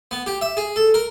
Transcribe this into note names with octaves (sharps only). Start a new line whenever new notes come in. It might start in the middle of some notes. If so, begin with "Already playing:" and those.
B3
G4
E5
G#4
A4
A#4